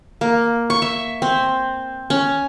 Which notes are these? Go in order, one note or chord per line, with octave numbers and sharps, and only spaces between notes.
A#3
C#6
E5
C4
C#4